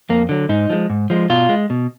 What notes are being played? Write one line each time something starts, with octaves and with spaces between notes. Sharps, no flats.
F2 A#3
D3 F#3
G#2 D#4
F3 G#3
G#2
F3 G#3
B2 F4
G#3
B2